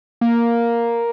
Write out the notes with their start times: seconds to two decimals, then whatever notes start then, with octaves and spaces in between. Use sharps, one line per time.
0.21 A#3